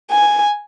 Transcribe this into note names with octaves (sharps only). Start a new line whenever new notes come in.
G#5